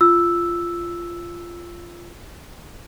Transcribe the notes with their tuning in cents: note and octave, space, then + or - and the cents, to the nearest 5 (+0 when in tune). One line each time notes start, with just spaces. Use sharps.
F4 -15 E6 +0